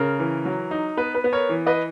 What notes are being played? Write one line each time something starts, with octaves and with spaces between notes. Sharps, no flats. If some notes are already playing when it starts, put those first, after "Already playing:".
Already playing: C#3 A#4
E3
F#3
D#4
B3 B4
B4
B3
A#4 C#5
E3
B4 D#5